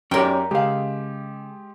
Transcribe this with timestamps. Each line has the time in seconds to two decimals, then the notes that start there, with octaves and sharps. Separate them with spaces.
0.11 F#2 C#4 G4 A#4 C#5 D5 G5
0.51 C#3 G#3 G4 F5